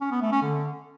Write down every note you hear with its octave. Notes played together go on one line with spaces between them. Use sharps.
C#4
B3
A3
C#4
D3